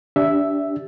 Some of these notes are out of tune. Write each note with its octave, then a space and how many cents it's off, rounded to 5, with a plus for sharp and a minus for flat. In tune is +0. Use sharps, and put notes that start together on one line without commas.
D4 -25 G4 +0 E5 +0